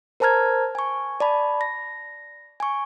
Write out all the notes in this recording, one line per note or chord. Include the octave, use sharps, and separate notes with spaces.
A#4 C5 A5 A#5 F6 G#6
G#5 C#6
D5 A5 B5
A#6
G#5 C#6